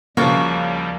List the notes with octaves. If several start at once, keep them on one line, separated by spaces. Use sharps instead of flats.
D#2 C#3 F3 G3 A#3 F#4 C#6 A6